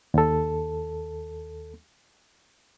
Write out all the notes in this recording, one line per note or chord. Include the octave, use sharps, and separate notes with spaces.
D#2 A4